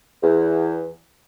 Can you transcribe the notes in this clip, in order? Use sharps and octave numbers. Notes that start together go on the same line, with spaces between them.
E2